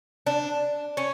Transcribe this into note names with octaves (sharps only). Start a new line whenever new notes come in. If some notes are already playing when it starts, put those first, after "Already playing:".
D4
C#4